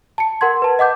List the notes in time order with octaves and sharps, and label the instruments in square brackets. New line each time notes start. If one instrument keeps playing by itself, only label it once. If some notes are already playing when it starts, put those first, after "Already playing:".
[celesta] A5 C#7
A#4 F#5 C6 G#6
B4 A5
D#5 F#5 D6 G6